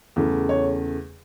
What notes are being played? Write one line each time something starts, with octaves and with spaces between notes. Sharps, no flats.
E2 C#3 A3
C#5